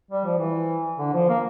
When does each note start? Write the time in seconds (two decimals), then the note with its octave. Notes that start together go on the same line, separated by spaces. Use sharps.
0.11 G3
0.25 F3
0.39 E3
0.99 D3
1.13 F3
1.29 A#3